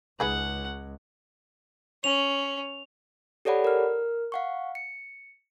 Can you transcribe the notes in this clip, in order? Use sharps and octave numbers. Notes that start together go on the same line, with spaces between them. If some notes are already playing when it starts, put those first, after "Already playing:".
C#2 D#4 G#4 B4 F#5
C#4 F7
G4 A4 C#5 D5 F#5 B5
A#4 F6
F5 F#5 C#6
C#7